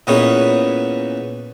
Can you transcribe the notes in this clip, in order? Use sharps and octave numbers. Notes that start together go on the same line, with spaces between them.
A#2 E3 B3 C#4 D#4 G#4